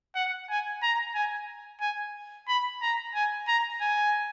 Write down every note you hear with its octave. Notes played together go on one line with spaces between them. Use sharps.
F#5
G#5
A#5
G#5
G#5
B5
A#5
G#5
A#5
G#5